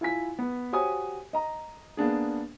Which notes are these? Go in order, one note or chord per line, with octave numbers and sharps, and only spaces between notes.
E4 F4 G#5 B6
B3
F#4 G4 C5 C#5 G#5 D#6
D#5 A#5
A#3 B3 D4 G#4